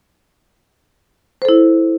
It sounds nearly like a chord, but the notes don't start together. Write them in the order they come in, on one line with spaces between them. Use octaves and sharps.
C5 A4 E4